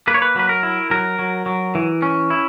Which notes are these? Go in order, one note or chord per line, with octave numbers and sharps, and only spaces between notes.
A#3 B4
C#5
B4
F#3 B4
A#4
E4
F#3 A#4
F#3
F#3
E3
C#4
E4